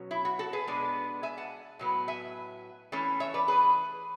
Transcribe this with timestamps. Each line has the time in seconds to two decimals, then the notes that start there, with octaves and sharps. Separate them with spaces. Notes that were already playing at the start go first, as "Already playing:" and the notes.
Already playing: B2 F#3 C#4
0.11 E4
0.25 F#4
0.39 F#4 A4
0.53 G#4 B4
0.67 B2 G#3 B3 D4
1.23 E5 G#5
1.37 F#5 A5
1.79 A2 F#3 B3
2.08 E5 G#5
2.92 E3 A3 C#4
3.20 C#5 E5
3.34 B4 D5
3.48 G#4 B4